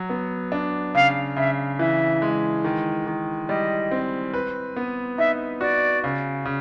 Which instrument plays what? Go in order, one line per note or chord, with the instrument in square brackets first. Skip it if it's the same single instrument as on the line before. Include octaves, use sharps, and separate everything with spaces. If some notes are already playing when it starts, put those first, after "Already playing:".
Already playing: [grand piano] F#3
B3
D4
[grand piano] C#3 [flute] F5
[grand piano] C#3 [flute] E5
[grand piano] E3 [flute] E5
[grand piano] G#3
D#3
D#3
[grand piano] G3 [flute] D#5
[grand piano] C4
B4
B3
[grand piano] D#4 [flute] E5
[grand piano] F#4 [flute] D5
[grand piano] C#3
C#3